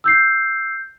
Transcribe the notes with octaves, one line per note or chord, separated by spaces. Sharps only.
E6 G6 C7